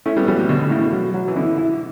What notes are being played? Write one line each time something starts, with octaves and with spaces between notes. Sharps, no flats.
A3 C#4 E4
G3 B3
E3 F#3 G3
A2
B2 D3
B2
A2 C#3 E4
B2
F#3
F#3
E3
B2 D3 E4
E4